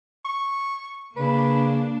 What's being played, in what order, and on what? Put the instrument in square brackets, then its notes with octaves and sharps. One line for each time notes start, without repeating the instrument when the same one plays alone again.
[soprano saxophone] C#6
[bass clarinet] C#3 [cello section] A#3 D4 [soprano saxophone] B4